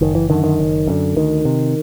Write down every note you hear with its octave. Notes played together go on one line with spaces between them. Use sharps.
F#1 D#3
E3
F#2 D3 D#3
D#3
F#1
F#2 D3
D2 D#3
C3